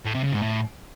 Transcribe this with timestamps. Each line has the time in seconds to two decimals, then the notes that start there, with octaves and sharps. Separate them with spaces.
0.05 A2
0.14 C3
0.24 C#3
0.33 G#2
0.42 A2